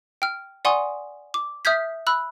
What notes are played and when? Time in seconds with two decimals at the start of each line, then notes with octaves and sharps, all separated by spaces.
0.22 G5 F6
0.65 D5 F#5 G#5 C6 C#6 D#6
1.34 D6
1.65 E5 D#6 F6 G6 G#6 B6
2.07 B5 E6 F#6